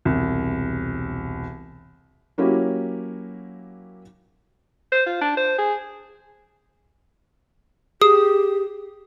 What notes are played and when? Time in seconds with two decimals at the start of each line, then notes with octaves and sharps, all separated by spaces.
0.05 E1 C2
2.38 F#3 A#3 C#4 E4 G4
4.92 C5
5.06 F4
5.21 D4
5.37 C5
5.58 G#4
8.02 G4 G#4 D#6